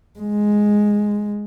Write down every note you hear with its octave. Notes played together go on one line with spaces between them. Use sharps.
G#3